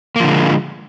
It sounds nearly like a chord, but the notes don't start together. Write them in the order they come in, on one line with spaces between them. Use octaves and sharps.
A#3 F3 D3 G#3